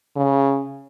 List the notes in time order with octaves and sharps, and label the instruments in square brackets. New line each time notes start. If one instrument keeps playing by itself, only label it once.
[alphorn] C#3